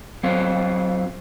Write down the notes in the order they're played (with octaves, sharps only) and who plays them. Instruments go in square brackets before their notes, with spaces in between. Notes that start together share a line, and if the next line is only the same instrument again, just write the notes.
[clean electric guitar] F#3 C4 C5 F5